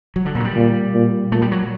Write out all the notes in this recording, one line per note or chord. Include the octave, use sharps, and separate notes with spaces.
F#3
D3
A#2
F#3
G3
A#2
A#2
A#2 A3
G3
F#3